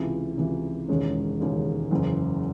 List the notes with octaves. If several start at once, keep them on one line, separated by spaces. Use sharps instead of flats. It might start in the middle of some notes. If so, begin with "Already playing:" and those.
Already playing: C#2 C3 E3
C#2 C3 E3
E1 D#2 C#3 G#3 C#4
E1 D#2 C#3 G#3 C#4
F#1 E2 C#3